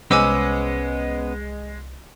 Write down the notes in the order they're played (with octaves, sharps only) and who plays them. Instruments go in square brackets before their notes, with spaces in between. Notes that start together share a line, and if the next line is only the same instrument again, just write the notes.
[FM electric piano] C2 [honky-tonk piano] G#3 [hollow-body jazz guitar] B3 C#4 C5 [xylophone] G#5 D6 E6